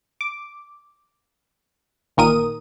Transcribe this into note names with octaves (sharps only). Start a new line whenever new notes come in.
D6
A1 A#2 D#3 A#4 D#6 D#7